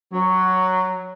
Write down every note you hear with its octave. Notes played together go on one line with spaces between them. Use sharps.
F#3